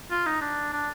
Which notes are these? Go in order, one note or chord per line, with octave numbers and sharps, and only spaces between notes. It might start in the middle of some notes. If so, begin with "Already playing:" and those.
F4
D#4
D4
D4